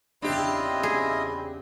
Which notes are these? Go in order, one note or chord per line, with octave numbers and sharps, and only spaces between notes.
E2 C#3 C4 D4 E4 F4 G4 D#5
G#4